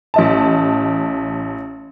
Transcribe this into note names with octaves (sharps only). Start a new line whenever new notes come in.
A1 D#5 A5